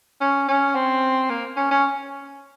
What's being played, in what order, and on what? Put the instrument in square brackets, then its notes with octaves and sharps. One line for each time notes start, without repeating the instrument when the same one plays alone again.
[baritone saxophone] C#4
C#4
C4
A#3
C#4
C#4